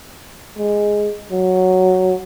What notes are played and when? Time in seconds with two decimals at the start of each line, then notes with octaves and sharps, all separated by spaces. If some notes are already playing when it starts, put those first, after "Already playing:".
0.58 G#3
1.31 F#3